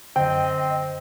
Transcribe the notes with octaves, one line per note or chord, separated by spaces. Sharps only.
F#2 D3 C4 D#5 G5